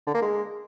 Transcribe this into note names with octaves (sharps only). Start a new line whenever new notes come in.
D3
A#3
G#3